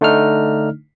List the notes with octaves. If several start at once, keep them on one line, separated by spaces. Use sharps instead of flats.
D3 A3 D4 D#4 F6